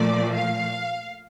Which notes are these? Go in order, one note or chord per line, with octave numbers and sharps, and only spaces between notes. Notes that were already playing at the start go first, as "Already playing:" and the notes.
Already playing: A#2 F3 A3 D5
F5